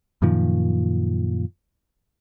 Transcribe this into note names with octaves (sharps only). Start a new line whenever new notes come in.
F#2 A#2 D#3 F3